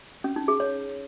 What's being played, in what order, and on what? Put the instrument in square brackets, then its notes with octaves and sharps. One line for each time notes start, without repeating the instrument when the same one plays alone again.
[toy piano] C#4
D#4
G#4
C#5